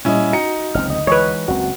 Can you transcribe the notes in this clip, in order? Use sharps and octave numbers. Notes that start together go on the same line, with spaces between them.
A#2 G3 C#4 E4 D#5
D#4 F#4 A#5 C#7
F#1 C#2 C4 F6
D2 D#5
E3 G#3 B4 C#5
F#1 C#2 C4 F#4 F#5